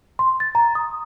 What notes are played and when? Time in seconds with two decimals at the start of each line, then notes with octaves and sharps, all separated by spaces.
0.19 C6
0.40 A6
0.55 A#5
0.75 D#6